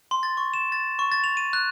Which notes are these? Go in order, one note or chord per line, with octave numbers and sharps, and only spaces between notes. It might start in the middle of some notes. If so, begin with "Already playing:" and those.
C6
A6
C#6
E7
A6
C#6
A6
F7
D#7
F#6